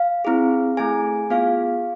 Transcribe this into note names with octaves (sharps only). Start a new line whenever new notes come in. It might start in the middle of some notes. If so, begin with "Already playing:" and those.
Already playing: F5
C4 E4 G#4
A3 E4 G#4 G#5
B3 F4 G#4 F5